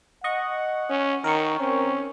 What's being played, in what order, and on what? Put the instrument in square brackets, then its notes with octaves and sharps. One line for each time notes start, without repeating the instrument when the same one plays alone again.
[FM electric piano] D#5 C#6 [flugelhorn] F#5
[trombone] C#4
[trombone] D#3 [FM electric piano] A#4 C#6
[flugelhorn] C4 [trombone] C#4